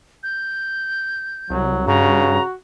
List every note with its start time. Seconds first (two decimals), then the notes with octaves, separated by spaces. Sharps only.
0.23 G6
1.50 C2 F#3
1.87 G2 C#3 F#4 A#5